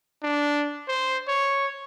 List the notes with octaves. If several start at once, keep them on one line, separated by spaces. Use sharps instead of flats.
D4
C5
C#5